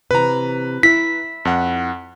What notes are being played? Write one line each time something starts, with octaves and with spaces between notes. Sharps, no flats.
C3 E3 B4 A#5
E4 E5 B6
F2 F#5